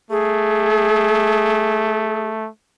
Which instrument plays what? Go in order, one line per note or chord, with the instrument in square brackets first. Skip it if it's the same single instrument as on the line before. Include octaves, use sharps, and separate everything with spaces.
[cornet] A3 [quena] G#4